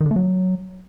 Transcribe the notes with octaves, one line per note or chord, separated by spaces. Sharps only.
D#3
D3
A3
F#3